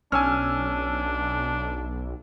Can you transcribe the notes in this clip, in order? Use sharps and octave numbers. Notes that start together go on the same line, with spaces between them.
B1 C#4 D4 G#5 E6 F6